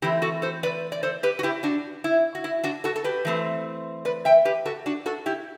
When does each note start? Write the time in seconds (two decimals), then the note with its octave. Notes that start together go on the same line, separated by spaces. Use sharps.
0.02 E3 A3 C4 E4 G4
0.22 F#4 A4
0.42 A4 C5
0.63 B4 D5
0.92 D5
1.03 A4 C5
1.23 G4 B4
1.39 F#4
1.43 E4 G4
1.63 D4 F#4
2.04 E4
2.35 F#4
2.44 E4
2.64 D4 F#4
2.84 F#4 A4
2.96 A4
3.04 G4 B4
3.25 E3 A3 C4
4.05 B4 D5
4.25 E5 G5
4.45 G4 B4
4.65 F#4 A4
4.86 D4 F#4
5.06 F#4 A4
5.26 E4 G4